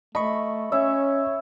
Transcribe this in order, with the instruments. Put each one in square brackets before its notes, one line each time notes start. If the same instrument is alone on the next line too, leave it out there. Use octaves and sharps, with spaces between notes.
[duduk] A3 [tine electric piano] D#5 C#6 [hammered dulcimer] B5
[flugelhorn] C#4 [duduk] C#5 [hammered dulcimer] E5